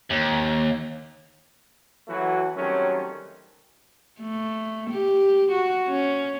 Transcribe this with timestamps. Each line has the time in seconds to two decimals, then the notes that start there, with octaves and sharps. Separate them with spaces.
0.10 D#2
2.08 E2 E3 F#3 A3 F#4
2.56 D#3 F#3 G3 A3 C4 C#4
4.21 A3
4.90 G4
5.52 F#4
5.88 C#4